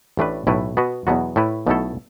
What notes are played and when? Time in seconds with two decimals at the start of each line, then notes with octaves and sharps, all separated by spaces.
0.17 A1 A2 A3 D4 B4
0.47 B1 A2 A3 E4 B4
0.77 B2 B3 F#4 B4
1.07 E2 B2 F#3 B3 F#4
1.36 A2 A3 E4 B4
1.67 B1 B2 A3 E4 A4